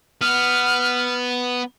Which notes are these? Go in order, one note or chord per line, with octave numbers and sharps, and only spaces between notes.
B3 F6